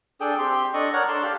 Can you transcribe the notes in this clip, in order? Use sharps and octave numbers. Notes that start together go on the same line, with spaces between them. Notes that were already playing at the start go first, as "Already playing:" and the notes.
D4 G#4 A4 G5
C4 G4 C6
D4 A4 D#5 C#6
A#4 C#5 D5 F#5
D4 A4 A5 C6
G4 D5 F5